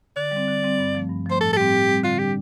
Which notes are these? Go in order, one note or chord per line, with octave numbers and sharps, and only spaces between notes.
D3 D5
G3 C4
D3
G3 C4
G2
F3 A3
G2
F3 A3 C5
A2 A4
A4
G3 C4 G4
A2
G3 C4
D3 F4
G3 D4 G4